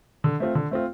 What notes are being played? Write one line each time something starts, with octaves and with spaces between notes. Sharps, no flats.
D3
A3 C4 F4
D3
A3 C4 F4